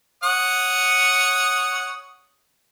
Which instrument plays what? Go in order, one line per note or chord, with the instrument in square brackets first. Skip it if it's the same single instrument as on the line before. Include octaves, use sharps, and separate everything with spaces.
[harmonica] C#5 F#5 D#6